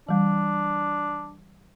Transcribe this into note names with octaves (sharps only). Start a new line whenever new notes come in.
E3 G3 D4